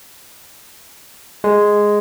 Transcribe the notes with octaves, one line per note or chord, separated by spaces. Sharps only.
G#3